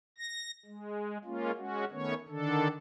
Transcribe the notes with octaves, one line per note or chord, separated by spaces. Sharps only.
A#6
G#3
G#3 A#3 C#4 F4
G#3 C#4 F#4
D#3 A3 B3 C#4 C#5
D3 D#3 D4 A4